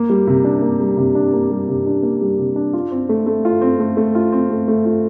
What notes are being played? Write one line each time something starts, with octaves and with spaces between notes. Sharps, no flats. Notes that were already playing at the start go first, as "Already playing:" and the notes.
Already playing: A#3
G3
C3
D4
A#3
G3
C3
D4
A#3
G3
C3
D4
A#3
G3
C3
D4
F4
C4
A3
A3
F4
C4
A3
A3
F4
C4
A3
A3
F4